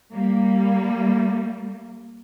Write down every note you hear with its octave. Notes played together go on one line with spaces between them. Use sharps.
G3 A#3